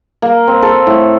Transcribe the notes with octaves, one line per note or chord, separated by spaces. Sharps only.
A#3
C4
A4
A2